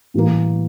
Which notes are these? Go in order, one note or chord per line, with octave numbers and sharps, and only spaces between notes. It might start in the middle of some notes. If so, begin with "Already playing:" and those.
A2 E3 G3 A#3